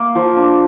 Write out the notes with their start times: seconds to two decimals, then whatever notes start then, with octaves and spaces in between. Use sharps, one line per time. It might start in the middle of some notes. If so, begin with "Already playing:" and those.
Already playing: A#3
0.15 F3
0.36 D4